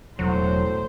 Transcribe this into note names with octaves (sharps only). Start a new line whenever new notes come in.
E1 A2 F#3 C5